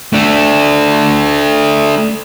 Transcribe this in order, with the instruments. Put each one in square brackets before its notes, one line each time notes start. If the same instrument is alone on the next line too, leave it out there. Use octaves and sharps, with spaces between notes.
[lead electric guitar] A3 D4